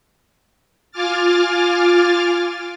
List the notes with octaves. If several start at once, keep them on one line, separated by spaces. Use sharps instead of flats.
F4 G#5 D6 F6 A6